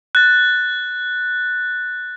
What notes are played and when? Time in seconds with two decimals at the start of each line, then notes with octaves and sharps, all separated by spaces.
0.15 F#6 A6